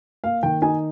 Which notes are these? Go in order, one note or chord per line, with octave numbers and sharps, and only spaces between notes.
A#3 F5
D#3 G5
D#4 G#5